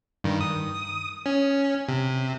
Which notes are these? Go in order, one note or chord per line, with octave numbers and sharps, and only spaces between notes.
G2 D#3
D#6
C#4
C3